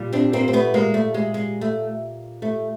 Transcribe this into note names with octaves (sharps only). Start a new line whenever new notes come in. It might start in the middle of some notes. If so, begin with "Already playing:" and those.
Already playing: A#2 G3
C4 D4
A#3 C4
C4
A3 B3
G#3 A#3
A3
G#3
G#3
A3
A3